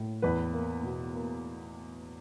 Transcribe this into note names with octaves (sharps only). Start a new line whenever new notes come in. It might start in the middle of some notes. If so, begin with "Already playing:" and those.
Already playing: A2
E2 B4
A#3
B2
A#3